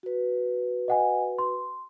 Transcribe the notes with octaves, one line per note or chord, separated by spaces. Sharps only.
F#4 B4
D#5 F#5 G#5
C6